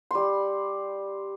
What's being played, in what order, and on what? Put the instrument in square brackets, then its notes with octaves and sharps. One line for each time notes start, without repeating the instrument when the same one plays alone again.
[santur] G3 C6